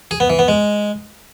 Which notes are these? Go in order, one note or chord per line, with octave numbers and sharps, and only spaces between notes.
G#4
B3
E3
B3
G#3